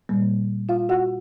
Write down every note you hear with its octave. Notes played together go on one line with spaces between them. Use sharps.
A#2 G3 A#3
F4 F5
F#4 F#5